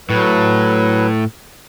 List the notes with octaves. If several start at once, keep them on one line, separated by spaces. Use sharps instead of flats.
A2 F#3 B4